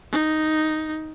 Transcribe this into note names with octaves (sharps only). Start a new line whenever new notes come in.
D#4